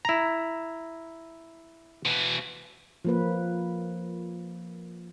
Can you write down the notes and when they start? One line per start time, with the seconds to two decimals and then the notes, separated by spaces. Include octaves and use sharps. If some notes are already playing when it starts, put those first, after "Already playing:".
0.05 E4 A#5
2.05 B2 E3
3.05 F3 A#3 B4